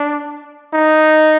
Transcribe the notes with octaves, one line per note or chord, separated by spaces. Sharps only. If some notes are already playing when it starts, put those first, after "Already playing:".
Already playing: D4
D#4